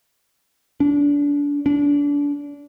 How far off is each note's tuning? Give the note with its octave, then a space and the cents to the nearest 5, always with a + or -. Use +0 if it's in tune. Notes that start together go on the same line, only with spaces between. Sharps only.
D4 -30
D4 -30